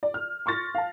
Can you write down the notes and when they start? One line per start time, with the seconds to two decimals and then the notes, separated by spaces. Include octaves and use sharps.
0.03 D5
0.14 F6
0.46 C6 C#6 F6 A6 A#6
0.75 F5 A5